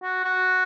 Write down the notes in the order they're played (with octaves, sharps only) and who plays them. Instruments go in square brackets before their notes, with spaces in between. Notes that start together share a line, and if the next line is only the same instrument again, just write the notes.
[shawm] F#4
F#4